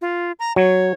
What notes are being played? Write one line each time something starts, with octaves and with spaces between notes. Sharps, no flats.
F4
A#5
F#3 C#5